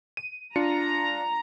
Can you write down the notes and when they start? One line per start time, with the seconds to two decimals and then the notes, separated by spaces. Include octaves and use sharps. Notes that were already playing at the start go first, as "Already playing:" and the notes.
0.17 D#7
0.56 D4 F4 A#5 C#7